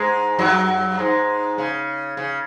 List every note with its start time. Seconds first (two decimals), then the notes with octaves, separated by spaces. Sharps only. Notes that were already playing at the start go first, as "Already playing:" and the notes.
Already playing: G#2 G#3
0.39 F#2 F#3
0.99 G#2 G#3
1.58 C#3
2.17 C#3